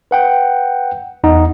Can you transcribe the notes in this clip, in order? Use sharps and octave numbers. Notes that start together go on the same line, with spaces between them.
B4 F#5 G5
E2 D#4 F#5